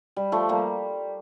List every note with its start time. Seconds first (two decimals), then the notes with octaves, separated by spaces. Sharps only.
0.16 G3
0.32 F3 A3
0.49 G3 A#3